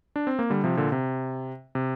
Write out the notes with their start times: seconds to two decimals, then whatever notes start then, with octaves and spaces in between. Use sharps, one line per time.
0.16 D4
0.27 C4
0.39 A#3
0.50 D3 G3
0.64 C3 F3
0.77 A#2 D3
0.92 C3
1.75 C3